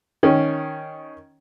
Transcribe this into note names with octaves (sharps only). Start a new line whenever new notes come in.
D#3 C#4